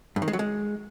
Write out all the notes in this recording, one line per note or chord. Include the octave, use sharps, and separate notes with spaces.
G2
D#3
G#3
F#3
G#3